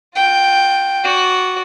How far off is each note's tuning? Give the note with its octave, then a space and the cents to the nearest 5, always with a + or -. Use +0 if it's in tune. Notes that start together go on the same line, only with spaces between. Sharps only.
F4 +35 G5 +0
F#4 +0 D5 -20